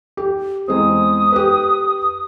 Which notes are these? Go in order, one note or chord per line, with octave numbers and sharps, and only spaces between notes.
G4
E2 G#3 C4 D#6
G4 B4